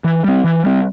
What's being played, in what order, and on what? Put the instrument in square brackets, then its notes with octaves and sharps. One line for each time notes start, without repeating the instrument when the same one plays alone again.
[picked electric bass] E3
G3 C4
E3
G3 C4